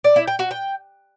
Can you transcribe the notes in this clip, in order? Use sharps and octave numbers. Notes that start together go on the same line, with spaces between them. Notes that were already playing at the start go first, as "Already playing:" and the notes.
D5
E4
G5
F#4
G5